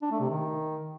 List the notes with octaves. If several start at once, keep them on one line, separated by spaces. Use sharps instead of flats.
D4
A3
C3
D#3